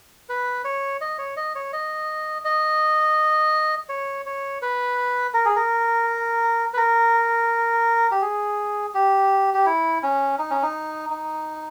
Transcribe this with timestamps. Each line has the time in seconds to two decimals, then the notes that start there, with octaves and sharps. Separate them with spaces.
0.29 B4
0.65 C#5
1.01 D#5
1.18 C#5
1.37 D#5
1.55 C#5
1.73 D#5
2.45 D#5
3.89 C#5
4.26 C#5
4.62 B4
5.34 A#4
5.45 G#4
5.56 A#4
6.74 B4
6.77 A#4
8.11 G4
8.21 G#4
8.94 G4
9.54 G4
9.66 E4
10.03 C#4
10.39 D#4
10.50 C#4
10.63 D#4
11.10 D#4